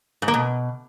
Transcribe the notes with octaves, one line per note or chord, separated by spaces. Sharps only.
G#2
A#3
B2